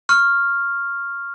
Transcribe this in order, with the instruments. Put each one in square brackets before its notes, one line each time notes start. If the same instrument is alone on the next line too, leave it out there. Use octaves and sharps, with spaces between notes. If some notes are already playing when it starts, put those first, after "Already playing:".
[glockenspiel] C#6 F6